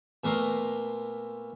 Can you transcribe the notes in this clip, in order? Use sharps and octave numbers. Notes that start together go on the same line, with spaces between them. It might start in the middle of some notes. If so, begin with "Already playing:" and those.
A#2 A3 B3 A#4 A#5 C6